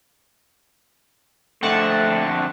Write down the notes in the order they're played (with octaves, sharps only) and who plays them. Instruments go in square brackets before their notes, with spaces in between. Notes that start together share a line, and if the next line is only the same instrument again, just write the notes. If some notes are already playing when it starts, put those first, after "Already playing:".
[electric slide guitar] F2 D3 C4 [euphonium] A3 [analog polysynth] F#5 A5 C#6